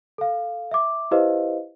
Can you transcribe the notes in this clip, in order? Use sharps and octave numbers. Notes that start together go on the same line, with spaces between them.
A4 F5
E5 D6
E4 G4 B4 C5 D#5 F5